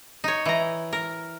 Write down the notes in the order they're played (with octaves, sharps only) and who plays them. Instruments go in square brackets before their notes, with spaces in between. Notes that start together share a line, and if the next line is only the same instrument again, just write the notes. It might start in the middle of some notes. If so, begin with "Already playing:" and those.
[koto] D#4 C#5
E3 A#5
A#4